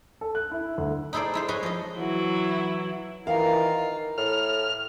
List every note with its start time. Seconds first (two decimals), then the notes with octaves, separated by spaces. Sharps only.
0.21 A4
0.35 F#6
0.51 E4
0.78 D2
1.13 D#4 E4 G#4 A4 C5 D5
1.34 G#3 E4 C5
1.48 G#4 B4 C#5 D#5 G#5
1.63 F3 D#5
1.97 E3 F#3 E4
3.27 D#3 E3 F4 A#4 F5
4.18 A2 F6